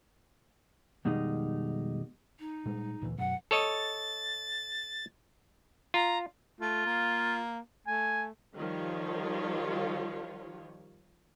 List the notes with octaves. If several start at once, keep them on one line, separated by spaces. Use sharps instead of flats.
F2 B2 D#3 G3 G#3 D#4
D#4
A#2 G3 G#3
D2 A#2 E3
F#2 B2 F#3 F#5
A4 C#5 D#5 A6
F4 A#5
A3 F4
A#3
A3 G#5
D#3 F3 G3 F4 C#5